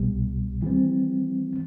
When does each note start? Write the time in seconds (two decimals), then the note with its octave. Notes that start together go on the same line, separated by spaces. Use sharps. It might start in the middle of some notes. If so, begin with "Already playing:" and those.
Already playing: C2 B2 G3
0.63 E3 G3 C4